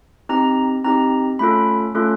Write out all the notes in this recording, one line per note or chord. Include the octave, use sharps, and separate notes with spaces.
C4 D#4 G4 A#5
C4 D#4 G4 A#5
A3 C#4 F4 A4 B5
A3 C#4 F4 A4